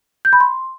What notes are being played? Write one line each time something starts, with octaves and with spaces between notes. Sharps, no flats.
G6
B5
C6